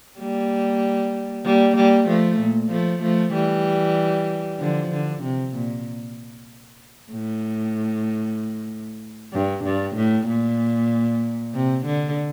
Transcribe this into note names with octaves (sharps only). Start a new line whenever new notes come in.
G3 A#3
G3 A#3
G3 A#3
F3 A3
A#2
F3 A3
F3 A3
E3 G3
D3 F3
D3
C3
A#2
A2
G2
G2
A2
A#2
C3
D3